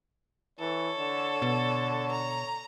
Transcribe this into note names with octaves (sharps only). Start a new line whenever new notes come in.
E3 A4 C#5
D3
B2
A#5